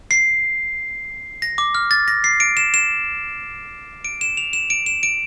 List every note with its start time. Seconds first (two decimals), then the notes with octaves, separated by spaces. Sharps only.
0.11 C7
1.42 A#6
1.58 D6
1.75 F6
1.91 A6
2.08 A#6
2.24 C7
2.40 D7
2.57 E7
2.74 E7
4.05 D7
4.21 E7
4.37 F7
4.53 E7
4.70 D7
4.86 E7
5.03 D7